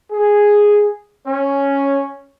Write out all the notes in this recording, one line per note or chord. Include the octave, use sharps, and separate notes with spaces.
G#4
C#4